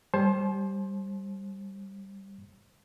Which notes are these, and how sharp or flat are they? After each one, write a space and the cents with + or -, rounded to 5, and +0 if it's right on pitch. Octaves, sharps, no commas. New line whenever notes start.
G3 +0 C5 +25 A5 -40